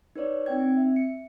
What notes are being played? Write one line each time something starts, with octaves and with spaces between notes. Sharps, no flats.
D#4 B4 C#5 D5
C4 D#4 G5 G#6
C4
E5
C#7